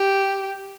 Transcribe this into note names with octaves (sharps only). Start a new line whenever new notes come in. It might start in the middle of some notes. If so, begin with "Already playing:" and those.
Already playing: G4